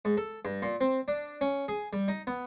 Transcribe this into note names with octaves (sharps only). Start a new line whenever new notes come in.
G#2
A4
G2
A#2
C4
D4
C#4
G#4
G3
D#4
B3